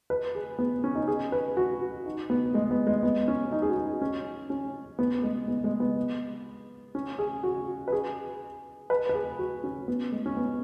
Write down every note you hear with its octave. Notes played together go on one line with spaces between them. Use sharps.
B4
G#4
B3
C#4
D#4
G#4
B4
F#4
D#4
B3
G#3
B3
G#3
B3
C#4
D#4
G#4
F#4
D#4
C#4
C#4
B3
G#3
B3
G#3
B3
C#4
G#4
F#4
B4
G#4
B4
B4
G#4
F#4
C#4
B3
G#3
C#4
B3